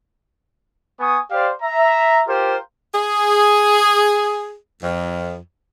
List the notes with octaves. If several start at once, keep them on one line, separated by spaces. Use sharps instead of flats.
B3 G#5 C#6 D#6
G4 C5 D5 F5
E5 A#5
F4 G4 A#4 C5
G#4
F2